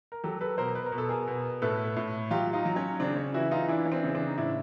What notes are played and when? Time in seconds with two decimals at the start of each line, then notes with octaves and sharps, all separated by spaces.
0.12 A#4
0.24 F#3 G4 A4
0.41 A4 B4
0.58 B2 A#4 C5
0.75 B4
0.86 A#4
0.92 B2
0.98 A4
1.09 G#4 A#4
1.28 B2
1.62 A2 A4 B4
1.96 A2
2.31 F#3 F4 G4
2.53 D#4 F4
2.65 F#3
2.76 C#4
3.00 C#3 C4 D4
3.17 C#4
3.34 E3 E4 F#4
3.51 D#4 F4
3.68 E3 D4 E4
3.85 C#4
3.92 C4 D4
4.04 C#3
4.15 C4 D4
4.27 D#4
4.37 A2 D4 E4